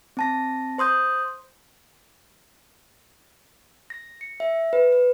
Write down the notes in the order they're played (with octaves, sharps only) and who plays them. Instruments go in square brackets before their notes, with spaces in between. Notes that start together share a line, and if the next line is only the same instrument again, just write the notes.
[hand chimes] C4 A5 A#6
C5 C6 D#6 G6
A#6
C#7
E5
B4
B4